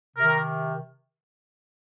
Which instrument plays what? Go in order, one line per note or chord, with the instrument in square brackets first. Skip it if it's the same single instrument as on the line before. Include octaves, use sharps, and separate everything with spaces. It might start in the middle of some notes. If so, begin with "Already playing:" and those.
[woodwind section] C3 D#3 A#4